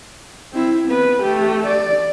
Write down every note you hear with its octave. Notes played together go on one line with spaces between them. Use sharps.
C4 E4
B3 B4
A3 G4
D5